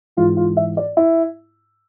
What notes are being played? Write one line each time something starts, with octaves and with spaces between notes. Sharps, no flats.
G#2 E3 F4
F4
E5
D5
E4